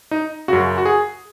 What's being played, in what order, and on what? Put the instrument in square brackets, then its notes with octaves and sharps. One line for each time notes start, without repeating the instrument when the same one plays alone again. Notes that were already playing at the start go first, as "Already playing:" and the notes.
[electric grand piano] D#4
F#2 C#3 F#4
F#4
G#4